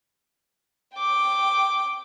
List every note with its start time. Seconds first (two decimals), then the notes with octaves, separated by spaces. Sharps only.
0.95 G5 D6